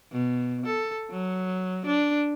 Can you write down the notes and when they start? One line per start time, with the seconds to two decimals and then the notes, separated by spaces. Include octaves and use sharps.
0.12 B2
0.66 A4
1.11 F#3
1.86 D4